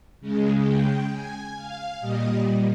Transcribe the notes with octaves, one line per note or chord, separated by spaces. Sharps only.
C#3 G#3
G5
G#5
F5
A#2 G3 D#5